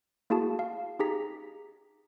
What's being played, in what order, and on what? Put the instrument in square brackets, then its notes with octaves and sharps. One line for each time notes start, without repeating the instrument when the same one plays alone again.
[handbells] A#3 E4 F#4 G#4 A5
F5
D#4 G4 G#4 A#5 B6